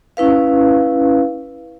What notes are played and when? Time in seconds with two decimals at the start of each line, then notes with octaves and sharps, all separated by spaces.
0.17 C#4 E4 B4 F5